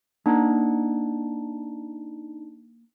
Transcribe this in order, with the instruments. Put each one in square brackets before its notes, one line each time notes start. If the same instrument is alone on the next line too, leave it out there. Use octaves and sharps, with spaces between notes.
[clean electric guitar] A#3 F#5 A#5 [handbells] D4 D#4